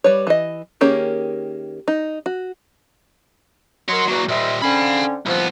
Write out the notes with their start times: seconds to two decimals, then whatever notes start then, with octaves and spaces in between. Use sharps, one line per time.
0.04 G3 B4 C#5
0.27 E3 D#5
0.81 D#3 A#3 C#4 G4 G#4
1.88 D#4
2.26 F#4
3.89 F#4 A#4 C#5 D#5 C6
4.08 E2 F#3 A#3 F#4
4.29 A#2 G3 C5 D#5 E5
4.62 D3 C4 C#4 F5 B5
5.26 C2 F3 B3